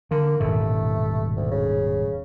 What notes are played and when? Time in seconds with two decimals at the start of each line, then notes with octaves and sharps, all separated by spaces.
0.11 D3 A#3
0.40 D#1 G#2 B2 A3
1.37 D2
1.51 C#3